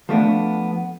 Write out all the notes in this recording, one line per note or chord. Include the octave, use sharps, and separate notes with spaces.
F3 A3 B3 D4